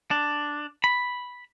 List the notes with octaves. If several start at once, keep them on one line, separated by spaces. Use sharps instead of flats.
D4
B5